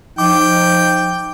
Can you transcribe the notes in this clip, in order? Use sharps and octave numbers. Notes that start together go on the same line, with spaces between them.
F3 D#4 G5 D6